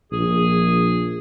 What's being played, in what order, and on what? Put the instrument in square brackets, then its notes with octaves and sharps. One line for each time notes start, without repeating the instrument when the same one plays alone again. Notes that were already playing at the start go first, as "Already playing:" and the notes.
[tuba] A#1 [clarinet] G#4